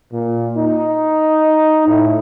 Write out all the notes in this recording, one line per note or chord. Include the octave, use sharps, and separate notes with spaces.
A#2
D#4
A2